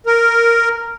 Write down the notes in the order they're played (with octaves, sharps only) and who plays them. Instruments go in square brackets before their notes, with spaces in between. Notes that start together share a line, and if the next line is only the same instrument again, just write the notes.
[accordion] A#4